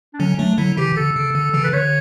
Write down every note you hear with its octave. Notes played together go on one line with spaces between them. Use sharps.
D4
D3 F#3 C#4
F#3 A3 D4
D3 F#3 E4
C#3 E3 G4
D3 A4
C#3
D3
C#3 E3
B4
D3 C#5